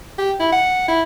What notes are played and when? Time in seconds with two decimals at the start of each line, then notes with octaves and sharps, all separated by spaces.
0.18 G4
0.40 E4
0.52 F#5
0.88 E4